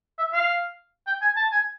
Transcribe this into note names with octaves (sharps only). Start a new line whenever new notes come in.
E5
F5
G5
G#5
A5
G#5